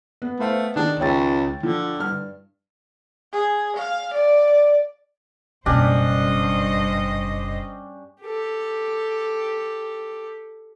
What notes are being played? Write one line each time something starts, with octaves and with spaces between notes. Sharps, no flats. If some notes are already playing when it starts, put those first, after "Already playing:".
B3
A3 B4 C5 F5
D#3 G#3 D4
C#2 C#5 G5 A6
D3 F3
G2 F6
G#4
F5
D5
F#1 G2 B2 C#4 D4 G4 C5 D#5
G4 A4